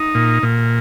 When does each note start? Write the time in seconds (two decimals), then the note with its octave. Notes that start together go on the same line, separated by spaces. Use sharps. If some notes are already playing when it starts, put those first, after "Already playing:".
Already playing: D#4
0.15 A#2
0.43 A#2